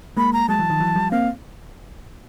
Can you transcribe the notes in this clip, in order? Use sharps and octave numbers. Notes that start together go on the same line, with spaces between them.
G#3 A#3 B5
A#5
F#3 G#3 A5
E3 F#3
D#3 F3
E3 F#3
F3 G3
A#3 C4 F5